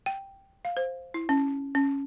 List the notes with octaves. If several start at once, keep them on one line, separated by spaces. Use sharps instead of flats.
G5
F5
C5
E4
C#4
C#4